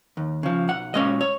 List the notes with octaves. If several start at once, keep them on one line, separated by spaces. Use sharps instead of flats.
D#2
C#3 F3
B1 F#5
A#2 G#3 C#4 D#5
C#5